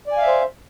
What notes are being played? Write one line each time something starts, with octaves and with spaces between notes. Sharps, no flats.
C5 D5 E5 F5 G#5